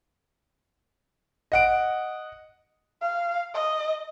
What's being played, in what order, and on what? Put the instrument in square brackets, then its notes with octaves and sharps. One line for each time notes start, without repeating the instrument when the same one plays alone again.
[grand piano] D#5 F#5 D7
[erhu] F5
D#5